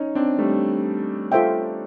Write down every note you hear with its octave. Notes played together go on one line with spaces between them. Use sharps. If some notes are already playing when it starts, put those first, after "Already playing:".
Already playing: C#4 D#4
C4 D4
G3 A3
F4 A4 C5 E5 G5